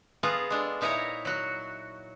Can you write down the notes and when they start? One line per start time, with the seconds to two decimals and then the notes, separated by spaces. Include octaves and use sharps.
0.23 B3 F4 G#4 A4 A#5
0.50 G#3 D4 A4
0.81 A#2 D#4 E4 C#5 E5 A#5
1.25 F#3 F#4